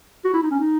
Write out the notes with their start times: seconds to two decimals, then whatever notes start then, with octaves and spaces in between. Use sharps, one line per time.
0.25 F#4
0.33 E4
0.42 D#4
0.51 C#4
0.59 D#4